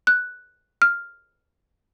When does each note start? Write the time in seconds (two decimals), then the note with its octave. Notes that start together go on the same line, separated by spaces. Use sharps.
0.07 F#6
0.82 F6